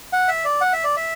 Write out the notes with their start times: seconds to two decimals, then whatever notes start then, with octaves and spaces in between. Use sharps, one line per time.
0.13 F#5
0.28 E5
0.45 D5
0.61 F#5
0.73 E5
0.84 D5
0.97 E5